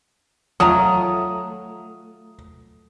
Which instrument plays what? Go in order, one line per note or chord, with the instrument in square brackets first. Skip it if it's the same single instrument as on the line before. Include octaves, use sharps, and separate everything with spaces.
[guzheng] F#3 A3 [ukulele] F4 A#5 [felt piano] D#6